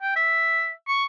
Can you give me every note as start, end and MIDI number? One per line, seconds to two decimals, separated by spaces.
0.02 0.15 79
0.15 0.71 76
0.88 1.05 85